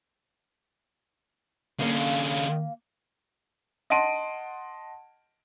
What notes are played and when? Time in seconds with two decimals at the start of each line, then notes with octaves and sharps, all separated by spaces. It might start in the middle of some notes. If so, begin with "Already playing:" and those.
1.79 D3 A#3 C#4 F5
3.90 D#5 F#5 A5 C6 D7 D#7